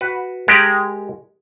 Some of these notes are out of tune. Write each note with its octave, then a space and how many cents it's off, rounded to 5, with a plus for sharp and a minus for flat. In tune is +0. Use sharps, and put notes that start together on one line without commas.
F#4 +0 B4 +0
G#3 -5 G4 -5 A#4 -25